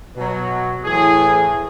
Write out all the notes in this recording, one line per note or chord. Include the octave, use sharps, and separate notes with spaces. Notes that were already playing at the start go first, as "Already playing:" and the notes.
B2 F#3
A2 E3 G#4